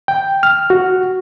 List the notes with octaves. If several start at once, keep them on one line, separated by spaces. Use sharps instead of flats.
G5
F6
F#4